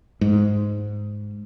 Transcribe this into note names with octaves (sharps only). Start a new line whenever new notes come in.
G#2